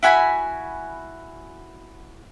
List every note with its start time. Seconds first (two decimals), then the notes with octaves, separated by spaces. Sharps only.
0.03 E4 F#4 G#5 B5